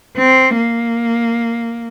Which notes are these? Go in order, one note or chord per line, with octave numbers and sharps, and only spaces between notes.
C4
A#3